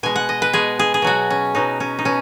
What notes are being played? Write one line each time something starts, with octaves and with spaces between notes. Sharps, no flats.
B2 G#3 G#5
F#5
D#5
B4
B2 G#3 G#4
G#4
G#4
B2 F#3 F#4
C#4
B2 F#3 D#4
C#4
D#4
B2 C#4